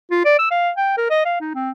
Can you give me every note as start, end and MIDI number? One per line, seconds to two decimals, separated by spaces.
0.11 0.21 65
0.25 0.38 74
0.39 0.47 88
0.51 0.70 77
0.77 0.95 79
0.97 1.07 70
1.10 1.22 75
1.25 1.40 77
1.40 1.51 63
1.55 1.70 60